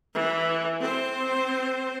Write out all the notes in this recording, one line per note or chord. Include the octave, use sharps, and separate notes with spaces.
E3
C4 C5